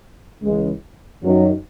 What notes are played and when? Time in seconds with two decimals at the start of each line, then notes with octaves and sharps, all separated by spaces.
0.42 C#2 C#3 E3 G#3
1.22 F#2 D#3 F#3